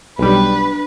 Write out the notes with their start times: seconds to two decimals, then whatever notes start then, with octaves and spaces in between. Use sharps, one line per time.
0.19 B1 G3 D4 B4